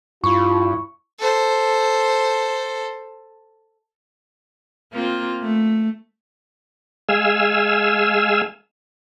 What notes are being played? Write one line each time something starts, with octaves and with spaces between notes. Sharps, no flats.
G2 E4 F4 C#6
A4 C5
A#3 C4 F4
A3
G#3 F5 G#5 E6